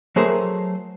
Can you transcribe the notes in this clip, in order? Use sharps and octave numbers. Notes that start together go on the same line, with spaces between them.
F#3 A3 G#4 A#4 C5